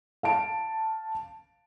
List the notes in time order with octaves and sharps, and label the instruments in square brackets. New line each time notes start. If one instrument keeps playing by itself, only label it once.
[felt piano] F5 A5 D7